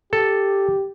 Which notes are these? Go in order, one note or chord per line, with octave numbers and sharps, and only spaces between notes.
G4 A4